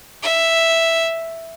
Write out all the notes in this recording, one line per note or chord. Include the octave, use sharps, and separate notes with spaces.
E5